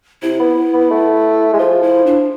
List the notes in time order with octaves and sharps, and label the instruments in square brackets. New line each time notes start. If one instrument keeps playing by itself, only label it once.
[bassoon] C3 [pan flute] E4
[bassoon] B3
B3
A3
G#3
[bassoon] F3 [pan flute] F4
[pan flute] E4
D4